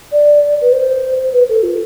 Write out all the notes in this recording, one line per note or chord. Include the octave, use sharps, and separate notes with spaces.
D5
B4
C5
B4
A4
F4